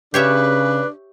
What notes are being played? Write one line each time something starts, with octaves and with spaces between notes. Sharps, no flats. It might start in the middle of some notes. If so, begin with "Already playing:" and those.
C#3 D4 G4 B4 C#5 E5